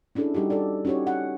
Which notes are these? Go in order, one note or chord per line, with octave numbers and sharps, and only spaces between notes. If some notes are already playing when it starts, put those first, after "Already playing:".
C#4 D4 E4 G#4 A4
G3 D#4 F#4 G4
A4 D5
C#4 D#4 F#4 G4 C#5
F#5